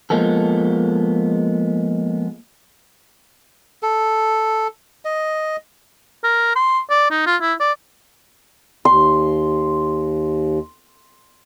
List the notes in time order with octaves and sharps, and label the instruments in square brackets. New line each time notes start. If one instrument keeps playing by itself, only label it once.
[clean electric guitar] F3 G#3 A#3 B3 A4
[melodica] A4
D#5
[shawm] A#4
C6
D5
D#4
F4
E4
D5
[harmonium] D#2 [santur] C6